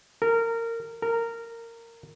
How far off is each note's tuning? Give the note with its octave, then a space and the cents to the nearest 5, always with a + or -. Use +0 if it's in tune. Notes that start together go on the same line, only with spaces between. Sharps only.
A#4 -20
A#4 -15